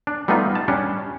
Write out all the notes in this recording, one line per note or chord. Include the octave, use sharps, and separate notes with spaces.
D4
G3 A3 B3 D#4 F4
A5
G3 C#4 D4